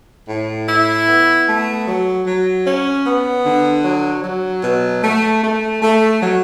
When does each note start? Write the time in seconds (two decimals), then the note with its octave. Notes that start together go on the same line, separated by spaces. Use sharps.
0.29 A2
0.69 E4
1.08 B3
1.48 A3
1.87 F#3
2.27 F#3
2.66 C#4
3.05 B3
3.45 D3
3.84 F#3
4.24 F#3
4.64 B2
5.03 A3
5.43 A3
5.82 A3
6.22 F#3